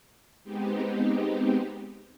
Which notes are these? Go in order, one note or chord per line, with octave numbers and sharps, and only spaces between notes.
G#3 B3 C4 D#4 G4